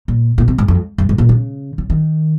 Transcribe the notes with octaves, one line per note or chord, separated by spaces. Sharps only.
A#2
A#2
C3
G#2
F2
F#2
G#2
A#2
C#3
C#3
D#3